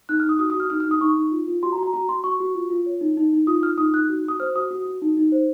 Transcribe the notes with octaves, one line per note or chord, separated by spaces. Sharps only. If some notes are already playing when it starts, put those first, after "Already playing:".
D#4 F#6
F6
D#4 D#6
F#4 D#6
D#6
F#4
F6
D#4 F6
F6
D#4
D#6
D#4 C#6
D#4
F4
F4
F#4 C6
A#5
F#4
A#5
F#4 A#5
F#4 C6
F#4 C#6
F#4
F4
F4
C#5
D#4
D#4
D#4
F4 D#6
F4 F6
D#4 D#6
D#4 F#6
F#4
F#4 D#6
C5 F6
F#4 D#6
F#4
F#4
D#4
D#4
C5